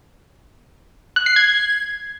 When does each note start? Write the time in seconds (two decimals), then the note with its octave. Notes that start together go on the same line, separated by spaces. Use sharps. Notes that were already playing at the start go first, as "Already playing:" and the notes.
1.16 F#6
1.26 C7
1.36 G#6